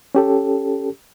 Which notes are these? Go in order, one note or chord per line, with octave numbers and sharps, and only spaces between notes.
C#4 G4 A4